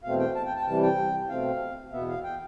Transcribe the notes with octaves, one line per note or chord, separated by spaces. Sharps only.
E2 B2 A3 C4 F5
G5
A5
G5
A5
G5
C3 E3 G3 A5
G5
B2 A3 C4 F5
E2 B2 B3 E5
F5
G5